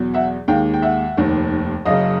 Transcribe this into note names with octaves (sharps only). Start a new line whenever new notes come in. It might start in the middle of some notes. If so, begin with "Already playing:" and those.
Already playing: E2 B2 F#3
E5 F#5
D#2 D#3 G#3 F5 G5
G5
E5 F#5
F1 D#2 D#3
F#1 F#2 C#3 D#5 F5